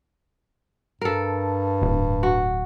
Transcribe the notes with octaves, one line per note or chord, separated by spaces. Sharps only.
G2 A4 A#4
D1
F#4